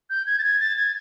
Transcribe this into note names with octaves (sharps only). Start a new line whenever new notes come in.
G6
G#6
A6
G#6
A6
G#6